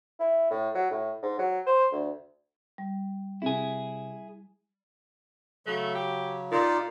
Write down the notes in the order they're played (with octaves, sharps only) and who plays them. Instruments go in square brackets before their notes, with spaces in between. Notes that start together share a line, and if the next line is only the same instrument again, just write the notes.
[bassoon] E4
A2
F#3
A2
G#2
F#3
C5
D2
[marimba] G3
[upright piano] C3 [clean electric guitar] E4 G#4
[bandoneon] C#3 F#3 [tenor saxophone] A3
[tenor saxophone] G4
[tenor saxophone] A#2 [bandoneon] D#4 F4 D5